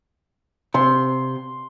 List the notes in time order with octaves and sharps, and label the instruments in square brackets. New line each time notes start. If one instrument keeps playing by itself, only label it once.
[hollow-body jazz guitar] C3 [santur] C6